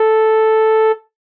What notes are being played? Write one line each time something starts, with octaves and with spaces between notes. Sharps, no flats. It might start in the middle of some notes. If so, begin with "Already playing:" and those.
Already playing: A4